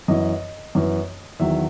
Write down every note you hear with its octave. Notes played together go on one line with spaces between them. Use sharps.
F#2 E3 B3 D#5
F#2 E3 B3
E2 D#3 F#3 E5